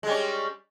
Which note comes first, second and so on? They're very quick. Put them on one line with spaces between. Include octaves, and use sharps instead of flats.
G#3 G3 C#4